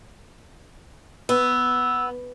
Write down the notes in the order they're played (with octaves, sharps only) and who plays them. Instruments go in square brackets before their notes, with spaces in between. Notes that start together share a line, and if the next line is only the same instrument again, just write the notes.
[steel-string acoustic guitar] B3 [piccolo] E6